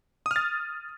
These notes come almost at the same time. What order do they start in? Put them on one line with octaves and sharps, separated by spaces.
D#6 F6 A6